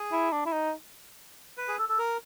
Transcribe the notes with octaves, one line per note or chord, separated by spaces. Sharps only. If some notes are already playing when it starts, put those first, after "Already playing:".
Already playing: G#4
E4
D4
E4
D#4
B4
G#4
A4
A4
A#4